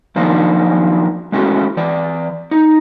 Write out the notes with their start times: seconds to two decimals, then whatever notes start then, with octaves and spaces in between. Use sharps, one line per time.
0.16 D#3 F3 F#3 A#3 D4 D#4
1.32 G#3 A3 C#4 E4 F#4
1.77 E3 D5
2.51 D#4